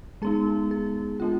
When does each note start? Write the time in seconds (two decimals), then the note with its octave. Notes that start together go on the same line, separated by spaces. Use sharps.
0.22 G#3 B3 D#4 G#4
0.71 G#4
1.20 G#3 B3 D4 F4